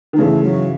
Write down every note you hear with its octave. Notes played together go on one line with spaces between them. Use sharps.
D#3
C#3 E3 A3
F#3